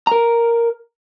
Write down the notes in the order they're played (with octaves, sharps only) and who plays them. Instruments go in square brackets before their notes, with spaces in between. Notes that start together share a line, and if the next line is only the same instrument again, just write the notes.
[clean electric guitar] A#4 A#5